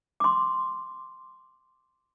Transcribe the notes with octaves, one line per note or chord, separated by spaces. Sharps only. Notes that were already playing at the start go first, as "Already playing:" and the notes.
C6 D6